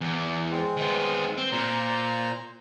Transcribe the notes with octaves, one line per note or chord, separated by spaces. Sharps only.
E2
G#3 C4
D#3 B3
C4
A#2 C5 A#5